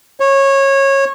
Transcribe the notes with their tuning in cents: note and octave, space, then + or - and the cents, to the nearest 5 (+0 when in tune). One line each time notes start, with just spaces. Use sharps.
C#5 -20